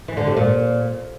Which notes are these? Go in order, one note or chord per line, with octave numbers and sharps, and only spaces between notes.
E3
D3
C3
A#2